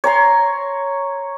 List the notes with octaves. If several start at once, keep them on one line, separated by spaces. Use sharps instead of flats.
C#5 A#5 C6